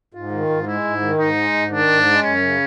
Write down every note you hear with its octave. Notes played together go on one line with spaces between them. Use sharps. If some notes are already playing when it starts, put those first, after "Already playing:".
G#2 F4
D#3
G#2
G#3 E4
G#2
D#3
G#2 D#4
G#3
G#2
D#3 D4
G#2
G#3
F#2 C#4
C#3